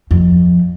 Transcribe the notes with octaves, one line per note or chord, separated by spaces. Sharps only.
F2